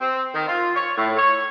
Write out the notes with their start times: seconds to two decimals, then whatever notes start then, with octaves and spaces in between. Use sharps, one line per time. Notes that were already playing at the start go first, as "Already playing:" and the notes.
0.01 C4
0.35 D#3
0.48 F4
0.75 C#5
0.97 A2
1.17 C#5